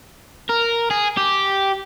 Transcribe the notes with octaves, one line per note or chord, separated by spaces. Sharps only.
A#4
G#4
G4